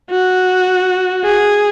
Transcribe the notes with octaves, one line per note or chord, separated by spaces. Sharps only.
F#4
G#4